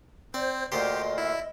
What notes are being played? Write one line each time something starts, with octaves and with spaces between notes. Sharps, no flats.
C4 C5 D5
D2 A#2 G4 C5 D#5
E4 E5